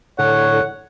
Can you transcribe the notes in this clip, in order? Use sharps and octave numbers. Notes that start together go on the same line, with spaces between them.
A2 D3 C#5 F#5